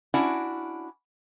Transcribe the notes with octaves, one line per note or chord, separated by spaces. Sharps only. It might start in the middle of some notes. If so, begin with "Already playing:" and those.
C#4 D4 E4 F#4 D5 F#5